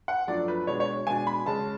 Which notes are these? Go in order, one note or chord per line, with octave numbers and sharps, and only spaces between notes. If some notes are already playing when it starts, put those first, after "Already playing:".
F#5
F#2 F3 A3 D4 D5
B4
B2 G#3 D4 C#5
C#5
B2 G#3 D4 G#5
B5
C#3 G#3 C#4 A5